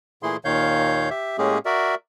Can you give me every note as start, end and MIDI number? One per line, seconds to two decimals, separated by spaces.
0.23 0.37 46
0.23 0.37 52
0.23 0.37 57
0.23 0.37 64
0.23 0.37 68
0.23 0.37 84
0.45 1.09 39
0.45 1.09 46
0.45 1.09 51
0.45 1.09 73
0.45 1.09 77
0.45 1.09 91
1.10 1.37 67
1.10 1.37 76
1.38 1.58 45
1.38 1.58 56
1.38 1.58 58
1.38 1.58 61
1.38 1.58 67
1.38 1.58 68
1.66 1.95 66
1.66 1.95 70
1.66 1.95 74
1.66 1.95 76